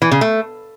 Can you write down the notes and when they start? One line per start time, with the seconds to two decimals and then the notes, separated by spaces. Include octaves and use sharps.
0.02 E3
0.11 C#3
0.21 A3